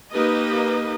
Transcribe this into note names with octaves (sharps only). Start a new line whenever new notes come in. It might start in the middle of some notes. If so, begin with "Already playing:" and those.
A#3 D#4 G4 B4 D#5